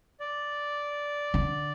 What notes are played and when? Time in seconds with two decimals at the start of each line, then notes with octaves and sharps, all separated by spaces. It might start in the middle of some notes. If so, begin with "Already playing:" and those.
0.20 D5
1.34 D3